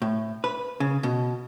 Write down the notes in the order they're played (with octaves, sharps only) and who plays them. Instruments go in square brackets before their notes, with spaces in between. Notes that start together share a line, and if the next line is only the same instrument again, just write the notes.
[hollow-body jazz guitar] A2
B4
C#3
B2